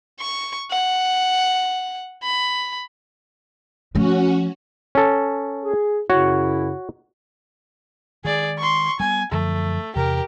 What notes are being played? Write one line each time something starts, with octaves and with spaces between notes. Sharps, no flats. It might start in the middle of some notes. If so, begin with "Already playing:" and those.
C#6
F#5
B5
F3 A3 C#4 F#4
C#4 A4
G#4
F#2 C#3 E4 F#4 C#5
D#3 G#3 G#4 D5
C6 C#6
G3 B3 G#5
F#2 D3 F3 A3
E2 C3 G4 A#4